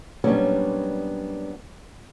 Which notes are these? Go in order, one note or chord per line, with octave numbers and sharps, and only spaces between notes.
A#2 F#3 G3 B3 C#4 D4